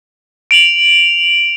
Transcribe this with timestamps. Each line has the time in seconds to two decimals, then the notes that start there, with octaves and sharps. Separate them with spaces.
0.51 D7 F7 F#7